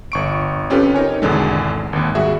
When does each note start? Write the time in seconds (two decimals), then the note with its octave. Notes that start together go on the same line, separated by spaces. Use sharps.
0.12 G1 C#6 D7
0.70 C4 C#4 F4 G4 A4 B4
0.94 D#4 A#4 C#5 G#5
1.22 G#1 E2 B2 D3 G#3
1.93 G#1 D#2
2.15 G3 F#4 G#4 E5